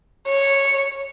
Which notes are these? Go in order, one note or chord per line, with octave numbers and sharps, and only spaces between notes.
C#5